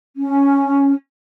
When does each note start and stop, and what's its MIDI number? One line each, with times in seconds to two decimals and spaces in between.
0.16 0.91 61